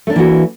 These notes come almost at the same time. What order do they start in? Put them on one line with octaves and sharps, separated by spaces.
A3 D4 A#3 E3 F#4